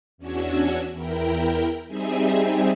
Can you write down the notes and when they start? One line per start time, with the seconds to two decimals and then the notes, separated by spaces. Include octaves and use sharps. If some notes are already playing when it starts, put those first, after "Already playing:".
0.18 E2 C#4 D4 F#4 E6 G#6
0.93 E2 E4 A#4 G5
1.87 G3 C4 D#4 G#4 E5 G#5